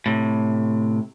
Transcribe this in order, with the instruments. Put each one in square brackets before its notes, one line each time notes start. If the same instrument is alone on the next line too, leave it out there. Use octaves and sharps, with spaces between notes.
[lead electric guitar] A2 C3